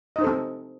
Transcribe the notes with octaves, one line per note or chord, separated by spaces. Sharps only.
C4 D#4 A4 C5 D#5